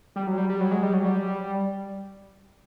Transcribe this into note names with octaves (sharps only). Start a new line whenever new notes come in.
G3
F#3
G3
G3
F#3
G#3
G3
F#3
G3